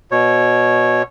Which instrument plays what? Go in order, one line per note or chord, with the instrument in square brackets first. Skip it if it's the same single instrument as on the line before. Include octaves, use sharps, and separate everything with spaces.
[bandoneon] B2 C#5